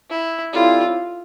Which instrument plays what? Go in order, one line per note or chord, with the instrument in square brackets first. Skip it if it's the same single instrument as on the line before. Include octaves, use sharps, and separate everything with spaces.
[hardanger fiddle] E4
[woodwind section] A2 G3 C4 E4 [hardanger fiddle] F4